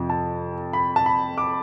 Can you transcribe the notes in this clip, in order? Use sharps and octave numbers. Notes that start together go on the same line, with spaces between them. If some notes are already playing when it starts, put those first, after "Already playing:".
Already playing: F2 C3 F3
A5
B5
A5
B5
D6